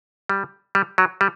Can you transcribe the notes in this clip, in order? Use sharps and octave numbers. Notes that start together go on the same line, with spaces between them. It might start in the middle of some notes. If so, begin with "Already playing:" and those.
G3
G3
F#3
G3